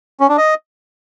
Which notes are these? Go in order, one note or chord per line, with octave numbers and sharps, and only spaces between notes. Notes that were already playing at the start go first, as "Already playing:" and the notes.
C#4
D4
D#5